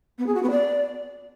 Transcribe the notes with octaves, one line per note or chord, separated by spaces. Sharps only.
B3
G#4
F#4
B3
D5